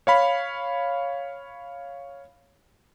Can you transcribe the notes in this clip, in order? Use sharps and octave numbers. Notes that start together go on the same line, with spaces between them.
C#5 F5 B5